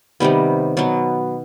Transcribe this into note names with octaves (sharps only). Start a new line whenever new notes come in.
C3 D#3 G3 B3
B2 F#3 B3